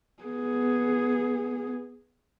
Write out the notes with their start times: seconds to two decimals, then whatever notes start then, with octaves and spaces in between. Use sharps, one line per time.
0.23 B3 G#4